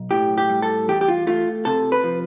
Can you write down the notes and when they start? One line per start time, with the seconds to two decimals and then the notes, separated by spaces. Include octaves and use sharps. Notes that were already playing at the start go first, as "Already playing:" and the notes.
Already playing: B1
0.11 A2 G4
0.38 G4
0.49 G3
0.62 A4
0.88 E2 G4
1.01 G4
1.08 F4
1.27 A3 F4
1.65 C3 A4
1.92 B4
2.04 F3